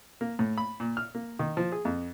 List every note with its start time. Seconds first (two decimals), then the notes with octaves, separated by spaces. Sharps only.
0.21 A#3
0.39 A2
0.58 B5
0.80 A#2
0.97 F6
1.15 A#3
1.39 D#3
1.57 F3
1.72 G#4
1.85 F2